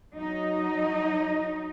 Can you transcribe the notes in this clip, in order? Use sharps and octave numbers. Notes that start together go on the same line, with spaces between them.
F#3 D#4